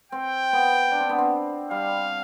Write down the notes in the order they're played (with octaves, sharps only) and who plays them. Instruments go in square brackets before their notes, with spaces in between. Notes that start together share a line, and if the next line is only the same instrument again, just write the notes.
[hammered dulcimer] C4 [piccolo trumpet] G5
[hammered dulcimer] B3
D4
C4
B3
C4
[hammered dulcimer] G3 [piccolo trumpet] F5